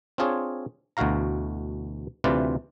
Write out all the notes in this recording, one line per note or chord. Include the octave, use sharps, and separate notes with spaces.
C4 D4 F4 G#4 C#5
D2 B2 E3 F#4 F5 A#5
D2 C3 E3 F4 B4 D5